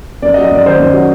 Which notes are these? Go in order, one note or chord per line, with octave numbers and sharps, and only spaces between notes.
F#2 D5
D#5
F#3
D#5
F#2 D5
D#3 C5
F#2
F#3